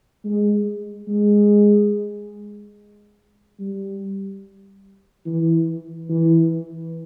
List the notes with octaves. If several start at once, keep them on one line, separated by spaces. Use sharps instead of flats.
G#3
G#3
G3
E3
E3